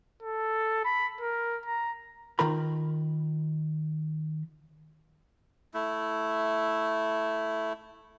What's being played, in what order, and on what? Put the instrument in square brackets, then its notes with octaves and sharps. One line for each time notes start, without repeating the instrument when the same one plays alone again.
[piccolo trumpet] A4
B5
A#4
A#5
[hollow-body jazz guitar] D#3 F4 A#4 B5
[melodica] A3 E4